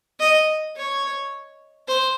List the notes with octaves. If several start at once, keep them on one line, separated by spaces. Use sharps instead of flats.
D#5
C#5
C5